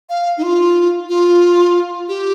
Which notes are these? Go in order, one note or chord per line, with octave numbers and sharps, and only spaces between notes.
F5
D#4
F4
F4
G4